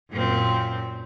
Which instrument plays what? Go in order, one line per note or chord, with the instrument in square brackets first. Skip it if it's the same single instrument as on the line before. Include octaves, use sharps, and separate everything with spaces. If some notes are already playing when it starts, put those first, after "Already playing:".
[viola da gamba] F#2 A#2 C4